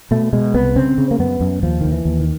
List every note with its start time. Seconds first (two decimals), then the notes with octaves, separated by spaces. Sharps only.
0.11 B2 A3
0.33 B2 G#3
0.54 C2 B3
0.76 C#3 C4
0.98 C#3
1.11 A#3
1.19 F#2 B3
1.41 F#2
1.63 D#2 F3
1.81 D#2 D#3
1.92 E3
2.05 D#2
2.20 D#3